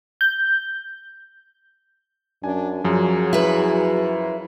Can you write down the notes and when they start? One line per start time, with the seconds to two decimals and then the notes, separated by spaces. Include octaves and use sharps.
0.21 G6
2.44 F#2 D4 G#5
2.84 F#2 F3 F#3 G#4
3.33 E4 B4